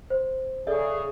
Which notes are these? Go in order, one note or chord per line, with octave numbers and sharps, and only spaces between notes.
C5
C#3 G#4 A4 D5 E5